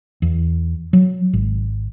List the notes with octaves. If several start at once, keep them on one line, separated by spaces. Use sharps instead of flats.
E2
F#3
G#1